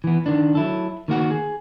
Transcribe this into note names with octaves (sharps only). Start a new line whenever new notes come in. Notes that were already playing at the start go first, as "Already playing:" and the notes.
E3 B3
D#3 D4
F#3 E4 A4
D#3 A#3 F#4 F#5
G#4